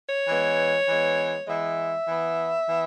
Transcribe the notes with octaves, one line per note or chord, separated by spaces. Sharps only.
C#5
E3 G#3 B3
E3 G#3 B3
E3 G#3 B3 E5
E3 B3
E3 B3